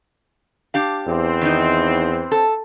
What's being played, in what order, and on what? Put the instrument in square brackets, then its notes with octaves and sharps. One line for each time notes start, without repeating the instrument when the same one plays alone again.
[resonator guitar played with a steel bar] D4 G4 F5
[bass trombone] E2 [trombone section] E3 C4
[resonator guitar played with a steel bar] D#3 D#4
A4